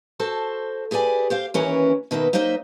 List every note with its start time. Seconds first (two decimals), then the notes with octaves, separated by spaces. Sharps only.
0.19 F#4 A4 C5 A5
0.91 G4 G#4 B4 D5 G#5
1.30 G4 C5 F5
1.54 D#2 E3 C#4 A#4 B4 C#5
2.11 B2 D#3 A#3 B3 E5
2.33 F#3 A#3 D#4 C5 D#5 E5